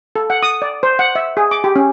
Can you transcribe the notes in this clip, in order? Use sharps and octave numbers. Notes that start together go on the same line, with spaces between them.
A4
F#5
D#6
D5
C5
F#5
E5
G#4
D6
G4
C#4